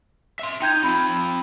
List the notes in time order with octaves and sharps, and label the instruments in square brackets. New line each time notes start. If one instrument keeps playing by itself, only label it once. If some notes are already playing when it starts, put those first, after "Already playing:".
[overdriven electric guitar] E5 C6
[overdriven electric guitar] D#4 [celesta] G5 G6 G#6
[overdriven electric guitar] C4 F4 [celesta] B5